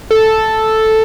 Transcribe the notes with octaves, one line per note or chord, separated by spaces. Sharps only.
A4